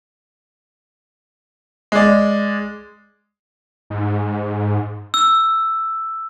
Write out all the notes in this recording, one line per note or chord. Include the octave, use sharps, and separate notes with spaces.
G#3 D5
G#2
E6